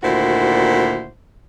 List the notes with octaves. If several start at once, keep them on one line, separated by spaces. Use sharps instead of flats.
D2 A#2 D#3 E4 F#4 C5